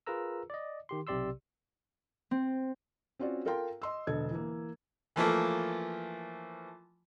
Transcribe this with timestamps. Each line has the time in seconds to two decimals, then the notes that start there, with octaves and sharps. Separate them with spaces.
0.07 F4 G#4 A#4 B4 A#5 E6
0.50 D5 D#5
0.89 D#3 G4 C6
1.07 B1 C3 G4 D5 C6 E6
2.31 C4
3.19 C4 C#4 F4 F#4 D5
3.45 F4 A4 A#4 F5 G5 C6
3.82 D#5 C6 E6
4.07 E1 D3 A4 D#5 G#6
4.31 E3 A#3
5.16 E3 F3 A3 A#3